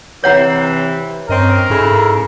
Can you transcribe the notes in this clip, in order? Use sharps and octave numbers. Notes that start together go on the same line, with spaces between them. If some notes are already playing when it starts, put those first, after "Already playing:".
C3 E3 C#5 F#5 A#5
G2 C4 C#4 A#4 D#5
G#2 C#3 E4 A4